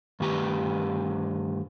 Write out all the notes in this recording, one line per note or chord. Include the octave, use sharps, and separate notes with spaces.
G2 D#3 A3 G4 B4 A#5